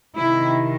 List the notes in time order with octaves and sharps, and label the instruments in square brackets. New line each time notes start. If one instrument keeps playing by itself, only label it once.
[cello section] C3 D#3 E4